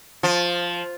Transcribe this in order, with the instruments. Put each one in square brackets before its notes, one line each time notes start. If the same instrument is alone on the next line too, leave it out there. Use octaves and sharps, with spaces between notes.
[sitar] F3